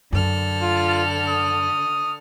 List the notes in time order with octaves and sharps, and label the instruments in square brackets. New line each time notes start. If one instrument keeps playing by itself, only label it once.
[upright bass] F#2 [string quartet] D3 A4 F6
[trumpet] F4
D#6